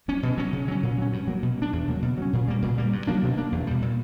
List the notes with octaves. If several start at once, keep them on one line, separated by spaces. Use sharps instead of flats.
F#3 C#4
B2
F#3 C#4
C#3
F#3 C#4
A#2
F#3 C#4
G2
F#3 A#3
B2
A#3
D4
E2
C#3 F#3 A#3
B2
F#3 C#4
A#2
G3 A#3
A#2
G3 A#3
G2
F#3 A#3 D4
B2
A#3 D4
E2
B2 G3
A#2